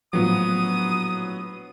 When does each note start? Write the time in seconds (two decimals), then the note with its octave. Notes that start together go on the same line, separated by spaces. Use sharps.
0.13 A#1 A2 F3 F#3 B3 D#6